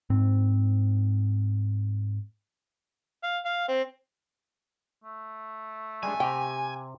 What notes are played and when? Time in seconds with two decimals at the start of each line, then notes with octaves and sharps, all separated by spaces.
0.10 G#2 C4
3.23 F5
3.45 F5
3.68 C4
5.04 A3
6.03 G3 G#3 D4 G#5
6.20 C3 G4 G5 A#5